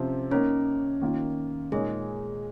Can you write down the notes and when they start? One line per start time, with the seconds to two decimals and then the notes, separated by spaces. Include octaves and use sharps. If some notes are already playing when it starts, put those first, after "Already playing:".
Already playing: C3 F3 C4 C#4
0.31 A#3 C#4 D#4 A#4 C#5
1.01 D#3 A#3 F4
1.72 A#2 G#3 D#4 G#4 A#4 C#5